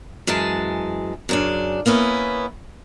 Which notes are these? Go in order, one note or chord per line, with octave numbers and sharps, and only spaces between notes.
F#2 E3 G#3 A5
F#2 C#3 D4
A#3 B3 C#4 E4